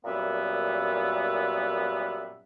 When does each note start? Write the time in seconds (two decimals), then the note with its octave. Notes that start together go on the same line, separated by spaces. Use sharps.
0.04 F#2 A#2 G3 B3 E5